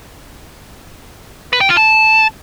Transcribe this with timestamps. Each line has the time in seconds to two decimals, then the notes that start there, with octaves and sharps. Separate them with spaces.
1.53 B4
1.61 G5
1.69 F4
1.77 A5